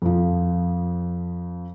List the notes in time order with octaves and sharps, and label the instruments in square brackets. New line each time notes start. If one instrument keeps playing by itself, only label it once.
[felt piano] F2 F3